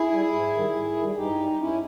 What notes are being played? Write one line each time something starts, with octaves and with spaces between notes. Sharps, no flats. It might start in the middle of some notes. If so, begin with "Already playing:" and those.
Already playing: E4 G#4
G3
G#2
D#3 G3
G#2
D#3 G3
G2 D#4 G4
G3
G4
G2 C#4 E4